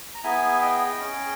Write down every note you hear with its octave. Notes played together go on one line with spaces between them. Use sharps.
A#5
B3 E4 G#4 E5 G#5
D#5 G5
C#4
G#4